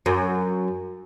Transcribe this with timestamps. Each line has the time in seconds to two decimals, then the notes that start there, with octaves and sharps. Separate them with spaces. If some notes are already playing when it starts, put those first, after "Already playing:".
0.06 F#2